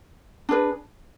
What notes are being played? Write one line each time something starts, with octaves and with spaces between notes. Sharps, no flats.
D4 G#4 B4